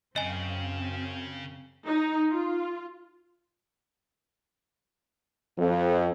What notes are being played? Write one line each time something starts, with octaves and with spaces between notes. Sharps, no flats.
F#2 C#3 C4 D#5 F5 G5 G#5
D#4
F4
F2